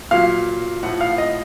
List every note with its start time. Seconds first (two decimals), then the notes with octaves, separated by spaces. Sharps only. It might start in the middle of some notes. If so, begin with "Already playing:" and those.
0.11 A#2 F#3 F5
0.83 A2 F3 F#5
1.01 F5
1.18 D#5